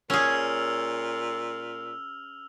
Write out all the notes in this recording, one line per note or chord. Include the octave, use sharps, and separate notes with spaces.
A#2 C#4 G#4 E6 F6 F7